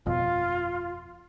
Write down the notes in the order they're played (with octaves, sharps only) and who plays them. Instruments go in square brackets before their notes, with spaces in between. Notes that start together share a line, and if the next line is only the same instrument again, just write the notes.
[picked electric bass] G1 F2 B2 [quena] F4